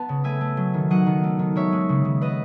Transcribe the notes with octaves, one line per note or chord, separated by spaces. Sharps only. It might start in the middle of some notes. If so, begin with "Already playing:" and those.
Already playing: B3 A5
C#3
A3 E5 G#5
A3
F#3
D#3
F#3 D#5 F#5
D#3
A3
D#3
G#3 C#5 E5
G#3
C#3
C#3
B3 B4 D#5